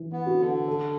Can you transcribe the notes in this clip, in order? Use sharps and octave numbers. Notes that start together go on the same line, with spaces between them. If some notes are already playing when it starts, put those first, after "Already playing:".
Already playing: E3
B3
F#4
D3
A4